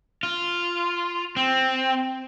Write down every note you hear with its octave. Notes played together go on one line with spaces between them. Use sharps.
F4
C4